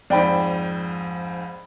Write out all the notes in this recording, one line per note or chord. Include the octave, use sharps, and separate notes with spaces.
F2 G#2 D5 G5 B5